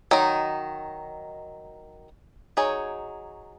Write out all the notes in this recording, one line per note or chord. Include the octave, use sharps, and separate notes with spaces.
D#3 F#3 D#4
F#3 D#4 G#4 C#5